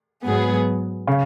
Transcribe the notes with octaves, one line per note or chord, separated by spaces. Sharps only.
G#2 F#3 B3 G#4
C#3